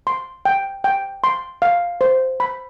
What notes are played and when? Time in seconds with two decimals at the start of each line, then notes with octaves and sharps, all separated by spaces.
0.07 C6
0.45 G5
0.84 G5
1.24 C6
1.62 F5
2.01 C5
2.40 B5